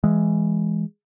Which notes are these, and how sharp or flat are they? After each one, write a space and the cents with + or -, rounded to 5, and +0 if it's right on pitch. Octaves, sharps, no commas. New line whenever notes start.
E3 +15 G#3 +0